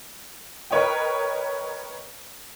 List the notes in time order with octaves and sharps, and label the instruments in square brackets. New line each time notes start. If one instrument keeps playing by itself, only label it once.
[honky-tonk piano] A#4 B4 C#5 D#5 G5